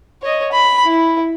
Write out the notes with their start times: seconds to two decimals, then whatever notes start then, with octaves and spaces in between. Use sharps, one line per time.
0.22 C#5 D#5
0.52 B5
0.85 E4